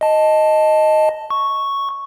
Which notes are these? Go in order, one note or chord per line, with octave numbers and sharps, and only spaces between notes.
D#5 A5
C#6